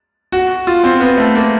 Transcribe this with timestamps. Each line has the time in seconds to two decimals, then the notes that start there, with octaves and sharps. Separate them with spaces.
0.32 F#4
0.67 F4
0.84 C4
1.00 B3
1.18 A3
1.35 A#3